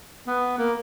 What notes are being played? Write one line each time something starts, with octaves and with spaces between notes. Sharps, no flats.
B3
A#3